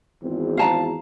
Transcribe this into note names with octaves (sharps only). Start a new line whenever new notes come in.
G#1 E2 C4
F5 A5 A#5